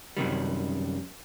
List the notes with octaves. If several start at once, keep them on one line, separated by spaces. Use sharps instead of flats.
F#2 C3 D#3 G3